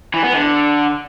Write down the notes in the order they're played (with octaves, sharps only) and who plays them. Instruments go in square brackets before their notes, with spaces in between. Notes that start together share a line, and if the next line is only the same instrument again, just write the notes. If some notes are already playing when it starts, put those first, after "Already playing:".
[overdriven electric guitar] E3
B3
D3